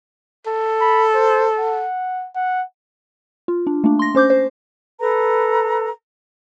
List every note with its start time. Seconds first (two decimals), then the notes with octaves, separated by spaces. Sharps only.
0.46 A4
0.81 B5
1.15 C5
1.59 F#5
2.36 F#5
3.48 F4
3.67 D4
3.84 A3 A#3 D4
3.99 C6 A#6
4.15 C#4 C5 D6 G6
4.30 C5
5.00 A4 B4 A#5